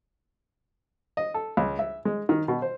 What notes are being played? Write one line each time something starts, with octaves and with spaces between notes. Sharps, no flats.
D#5
A4
C#2
E5
G#3
D#3
B2
C5